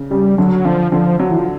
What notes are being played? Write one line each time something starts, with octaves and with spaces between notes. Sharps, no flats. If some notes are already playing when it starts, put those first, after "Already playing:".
Already playing: C#3
C#3 G3
D3 F#3
D3 F3
D3 F3
F#3
E3
F3